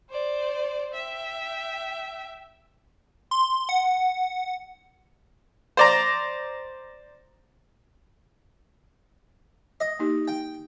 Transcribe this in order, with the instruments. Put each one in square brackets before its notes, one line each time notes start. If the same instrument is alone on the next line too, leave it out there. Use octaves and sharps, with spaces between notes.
[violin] C5 D5
E5 G5
[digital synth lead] C6
F#5
[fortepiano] C5 D5 A#5
[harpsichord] D#5
[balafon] A#3 D#4 G4
[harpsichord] G5